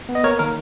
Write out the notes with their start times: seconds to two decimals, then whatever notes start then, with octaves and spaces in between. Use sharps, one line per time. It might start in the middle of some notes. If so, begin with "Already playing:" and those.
0.09 B3
0.15 D#5
0.23 A#3 A#4 C#5
0.39 D#3 A#4